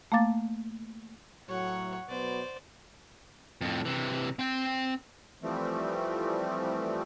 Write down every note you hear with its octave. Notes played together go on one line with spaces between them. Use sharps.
A3 A#3 F5 D6 A6
A2 F#3 C#5 F#5
B2 F#3 B3 C5 D5
F2 A2
C3 E3
C4 G5
E3 F3 G3 A3 C4